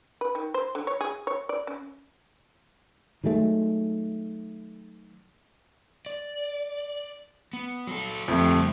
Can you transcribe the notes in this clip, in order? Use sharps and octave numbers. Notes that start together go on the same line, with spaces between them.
B4
D#3
C5
D3
C#5
G#4
C#5
D5
C#4
D#3 F#3 G#3 A3
D5
B3
F#3 A4
F2 D3 A3 C4 G4
C#3 G3 E5